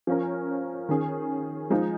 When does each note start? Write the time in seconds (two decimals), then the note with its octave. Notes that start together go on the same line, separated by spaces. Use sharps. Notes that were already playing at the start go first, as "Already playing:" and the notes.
0.07 F3 C#4 A#4
0.89 D#3 C#4 G#4
1.70 F3 G#3 D#4